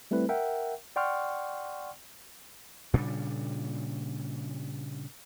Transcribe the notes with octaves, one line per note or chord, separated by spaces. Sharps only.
G3 A3 C4 E4 B4
A#4 E5 F#5 G5
D5 F#5 G5 C6 C#6 F6
A#2 C#3 G3 D4